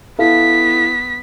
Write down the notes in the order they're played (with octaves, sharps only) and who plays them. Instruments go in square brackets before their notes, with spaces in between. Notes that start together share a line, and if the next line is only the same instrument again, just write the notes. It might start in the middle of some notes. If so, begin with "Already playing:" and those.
[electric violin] B3 B6 [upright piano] E4 A4 F5